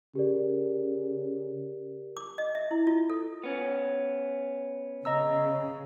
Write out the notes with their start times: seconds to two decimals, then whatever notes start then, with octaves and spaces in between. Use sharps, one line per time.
0.15 C#3 G4 A#4 D5
2.17 D6
2.38 D#5
2.55 E5
2.71 E4
2.87 F4
3.10 A4
3.44 B3 C#4
5.05 C#3 D#5 A#5 E6